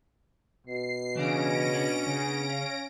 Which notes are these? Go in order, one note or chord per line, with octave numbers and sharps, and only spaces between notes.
B2 C7
C#3 E3 C#4 D4 F5 A#6 D7
B3 D4
C#3
F5